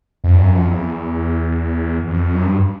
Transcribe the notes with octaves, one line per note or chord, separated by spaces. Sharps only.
F2
G2
F#2
F2
E2
E2
F2
F#2
G2